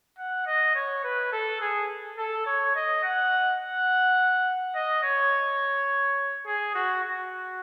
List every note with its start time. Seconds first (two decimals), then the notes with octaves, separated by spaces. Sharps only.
0.18 F#5
0.46 D#5
0.75 C#5
1.04 B4
1.32 A4
1.60 G#4
2.17 A4
2.46 C#5
2.75 D#5
3.03 F#5
3.61 F#5
4.75 D#5
5.03 C#5
6.46 G#4
6.75 F#4
7.03 F#4